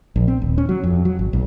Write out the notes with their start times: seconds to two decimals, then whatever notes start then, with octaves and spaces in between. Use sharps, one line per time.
0.16 A#1
0.28 C4
0.42 D#1
0.58 C#4
0.69 F#3
0.83 F2
1.05 F#3
1.19 G#1
1.33 B1